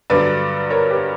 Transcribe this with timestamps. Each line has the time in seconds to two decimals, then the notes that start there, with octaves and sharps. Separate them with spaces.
0.10 G2 D3 F#3 B4 D5
0.70 A#4 C#5
0.90 G4 B4